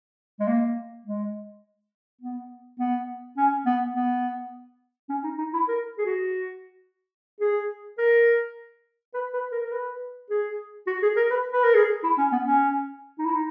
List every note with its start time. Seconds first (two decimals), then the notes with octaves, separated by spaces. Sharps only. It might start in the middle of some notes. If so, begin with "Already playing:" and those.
0.40 G#3
0.47 A#3
1.06 G#3
2.21 B3
2.79 B3
3.37 C#4
3.66 B3
3.94 B3
5.09 C#4
5.24 D#4
5.38 D#4
5.53 E4
5.68 A#4
5.98 G#4
6.05 F#4
7.41 G#4
7.98 A#4
9.14 B4
9.34 B4
9.52 A#4
9.65 A#4
9.71 B4
10.30 G#4
10.87 F#4
11.02 G#4
11.16 A#4
11.30 B4
11.52 B4
11.64 A#4
11.74 G#4
12.03 E4
12.18 C#4
12.32 B3
12.46 C#4
13.19 D#4
13.25 E4
13.33 D#4